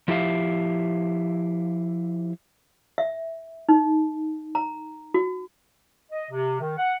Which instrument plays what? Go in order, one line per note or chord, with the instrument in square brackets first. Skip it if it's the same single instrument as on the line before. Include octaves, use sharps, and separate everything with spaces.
[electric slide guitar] F3 E4 G4 E5 F5
[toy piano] E5
D#4
A#5
F#4
[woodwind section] D#5
C3
D#3
F#5